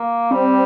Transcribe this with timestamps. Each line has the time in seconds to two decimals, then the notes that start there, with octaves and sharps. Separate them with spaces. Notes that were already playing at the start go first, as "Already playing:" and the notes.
Already playing: A#3
0.31 G3 C4